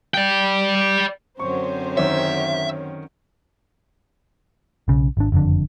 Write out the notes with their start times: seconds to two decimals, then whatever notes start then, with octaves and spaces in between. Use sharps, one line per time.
0.14 D5 G5
1.39 F#2 D3 C4 C5 C#5 C#6
1.97 D#3 C#4 E5
4.88 B1 C#3
5.17 G#1 D4
5.32 F#1 F2 D3